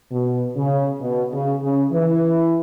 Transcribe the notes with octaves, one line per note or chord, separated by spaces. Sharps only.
B2
C#3
B2
C#3
C#3
E3